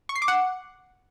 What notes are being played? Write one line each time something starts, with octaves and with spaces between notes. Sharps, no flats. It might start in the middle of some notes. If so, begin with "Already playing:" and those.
C#6
C7
D6
F#5